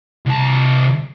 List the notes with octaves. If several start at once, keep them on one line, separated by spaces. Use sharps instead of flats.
C2 A5